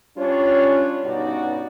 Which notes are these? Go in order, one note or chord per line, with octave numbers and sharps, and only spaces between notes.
G3 C#4 D4 F4 C#5
G2 B2 C#4 D#4 F#4 D5